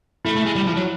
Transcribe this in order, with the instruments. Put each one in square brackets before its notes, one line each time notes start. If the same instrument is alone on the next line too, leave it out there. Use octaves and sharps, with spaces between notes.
[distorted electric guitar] A3 [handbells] E4
[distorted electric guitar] A3
G#3
G3
F3
F#3